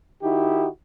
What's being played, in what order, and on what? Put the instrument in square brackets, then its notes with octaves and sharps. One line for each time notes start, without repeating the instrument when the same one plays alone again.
[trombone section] D#3 D#4 E4 F#4 G4